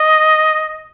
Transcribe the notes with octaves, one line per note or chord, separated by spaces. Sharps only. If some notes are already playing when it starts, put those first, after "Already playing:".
Already playing: D#5